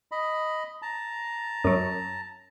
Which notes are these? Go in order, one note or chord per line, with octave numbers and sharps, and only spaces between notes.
D#5 B5
A5 A#5
F#2 F#3